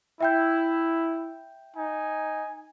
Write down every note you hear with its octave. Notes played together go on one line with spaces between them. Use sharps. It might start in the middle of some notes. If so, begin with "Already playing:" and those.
E4 E5 G5 G6
D#4 G#5